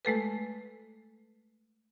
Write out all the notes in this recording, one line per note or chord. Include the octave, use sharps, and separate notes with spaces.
G#3 A3 A4 B4